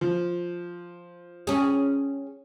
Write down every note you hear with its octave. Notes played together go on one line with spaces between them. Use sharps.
F3
C#4 G#4